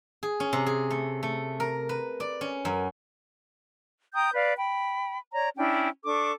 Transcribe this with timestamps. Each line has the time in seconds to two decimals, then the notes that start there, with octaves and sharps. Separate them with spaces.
0.23 G#4
0.40 C#4
0.53 C3
0.66 G#4
0.90 A3
1.23 A3
1.60 A#4
1.89 B4
2.20 D5
2.41 C#4
2.65 F#2
4.14 G5 A#5 D#6 G6
4.33 B4 D5 F5
4.56 G5 B5
5.33 C#5 D5 A#5
5.57 C#4 D4 E4 G5
6.05 D4 A4 C#6 D6